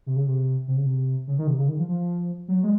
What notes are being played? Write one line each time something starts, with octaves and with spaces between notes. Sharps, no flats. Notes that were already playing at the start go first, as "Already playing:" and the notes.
C3
C#3
C3
C3
C#3
C3
C#3
D#3
C3
C#3
D#3
F3
F3
F#3
G#3